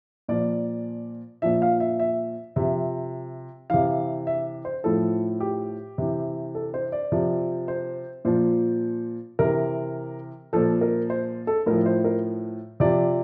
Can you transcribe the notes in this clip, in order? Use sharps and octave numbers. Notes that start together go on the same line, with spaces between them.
A#2 F3 D5
A#2 F3 E5
F5
E5
E5
C3 F3 E5
C3 E3 F5
E5
C5
A2 F3 A4
G4
C3 E3
A4
C5
D5
C3 F3
C5
A#2 F3 C5
C3 E3 A#4
A#2 F3 A4
A#4
C5
A4
A2 F3 A#4
C5
A#4
C3 F3 D5